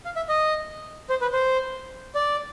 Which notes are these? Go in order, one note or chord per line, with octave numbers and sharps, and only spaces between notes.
F5
E5
D#5
C5
B4
C5
D5